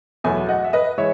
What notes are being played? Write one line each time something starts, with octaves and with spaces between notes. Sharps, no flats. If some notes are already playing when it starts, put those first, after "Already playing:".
E2 B2 F#3 A3 E5 G#5
D#5 F#5
E5
B4 D#5
E3 G#3 C#5 E5